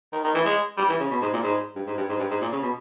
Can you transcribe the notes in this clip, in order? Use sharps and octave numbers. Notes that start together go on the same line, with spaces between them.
D#3
D#3
E3
G#3
G3
E3
C#3
B2
G#2
A#2
G#2
G2
G#2
G2
G#2
G2
G#2
A#2
C#3
B2